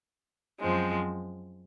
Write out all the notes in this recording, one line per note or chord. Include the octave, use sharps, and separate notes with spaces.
F#2 F3 G#3 C4